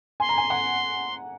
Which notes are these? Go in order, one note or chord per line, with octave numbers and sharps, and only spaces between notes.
G#5 C6
A#5
G#5
F#5